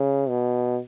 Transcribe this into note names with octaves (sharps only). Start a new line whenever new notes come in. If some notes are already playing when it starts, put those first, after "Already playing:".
Already playing: C#3
B2